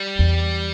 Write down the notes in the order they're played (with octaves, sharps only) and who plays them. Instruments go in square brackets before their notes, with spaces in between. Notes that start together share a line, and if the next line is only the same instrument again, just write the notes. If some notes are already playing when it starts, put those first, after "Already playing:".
Already playing: [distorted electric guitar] G3
[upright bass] E2